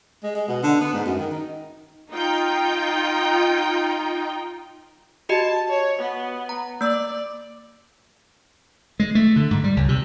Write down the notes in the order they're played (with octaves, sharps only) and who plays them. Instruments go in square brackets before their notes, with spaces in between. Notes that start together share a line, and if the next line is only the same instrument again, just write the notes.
[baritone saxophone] G#3
G#3
B2
D3
B3
G#2
F#2
D#3
D#4
[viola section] D#4 F4 G5
[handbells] F#4 G4 D#5 [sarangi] A5
[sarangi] C#5
B3
[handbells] A#5
[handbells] A#3 E6 [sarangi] D5
[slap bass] G#3
A3
D3
G#2
G3
C#2
C3